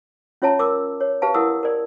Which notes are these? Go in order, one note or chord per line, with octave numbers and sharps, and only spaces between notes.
C#4 F4 C#5 E5 A5 A#5
A#4 D6 E6
C#5
G4 B4 F5 A5
E4 A#4 F#5 D#6 E6
A#4 D5